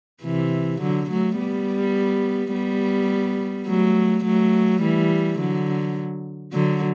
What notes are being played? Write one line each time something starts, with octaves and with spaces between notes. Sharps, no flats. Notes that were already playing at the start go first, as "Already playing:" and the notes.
C3 E3
D3 F#3
F#3 A3
G3 B3
G3 B3
F#3 A3
F#3 A3
E3 G3
D3 F#3
D3 F#3